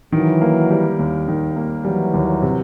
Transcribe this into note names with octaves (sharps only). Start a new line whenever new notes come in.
D#3 E3 F#3
A#3
G3
D#2
D#3
A#3
E3 F#3 G3
D#2
C3